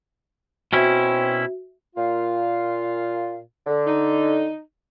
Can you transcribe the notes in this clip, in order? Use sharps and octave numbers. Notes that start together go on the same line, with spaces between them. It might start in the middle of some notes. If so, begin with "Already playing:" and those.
B2 C4 C#4 E4 F#4 E5
A#2 F4 F5
D3
D#4